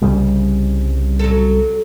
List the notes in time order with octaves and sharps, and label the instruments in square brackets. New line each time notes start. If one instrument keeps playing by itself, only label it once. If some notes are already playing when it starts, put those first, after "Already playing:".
[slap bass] C2 C#3 G3
[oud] F#3 A4